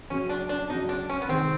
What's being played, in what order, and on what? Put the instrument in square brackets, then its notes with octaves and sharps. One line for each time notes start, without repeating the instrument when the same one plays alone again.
[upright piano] F#2 C#3 F#3 [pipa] C#4
[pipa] D4
D4
[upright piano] F#2 C#3 F#3 [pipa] D#4
[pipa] D4
C#4
B3
[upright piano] C3 D#3 G#3 [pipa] C4